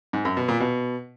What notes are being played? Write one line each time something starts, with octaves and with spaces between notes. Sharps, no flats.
G#2
F#2
B2
A#2
B2